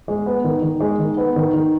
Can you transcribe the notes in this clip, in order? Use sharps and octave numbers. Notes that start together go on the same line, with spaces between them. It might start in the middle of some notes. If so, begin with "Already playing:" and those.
G#3
B3
D#3
D#3
G#3
D#3
B3
D#3
D#3